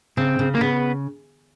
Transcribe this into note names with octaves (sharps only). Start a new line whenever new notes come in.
C#3 C4
C#3
A#3
C#3 B3